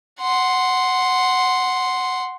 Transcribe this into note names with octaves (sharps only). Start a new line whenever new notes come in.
F#5 C6